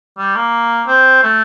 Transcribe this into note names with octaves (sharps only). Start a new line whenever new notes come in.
G3
A#3
C4
A3